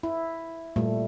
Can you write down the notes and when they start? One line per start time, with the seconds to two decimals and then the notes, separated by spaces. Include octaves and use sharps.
0.03 E4
0.76 A#2 G3 A3